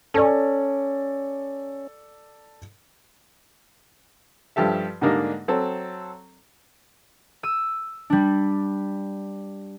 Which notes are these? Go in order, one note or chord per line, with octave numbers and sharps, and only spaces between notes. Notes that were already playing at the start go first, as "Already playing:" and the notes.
C#4 A4 D5
G2 F3 G4 A4 E5
G#2 D3 G3 A#3 D4 D#4
F#3 C4 A4
E6 D#7
G3 D4